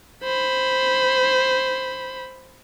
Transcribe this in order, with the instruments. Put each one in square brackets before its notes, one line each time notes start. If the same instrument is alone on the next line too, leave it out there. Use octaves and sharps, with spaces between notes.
[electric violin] C5 B5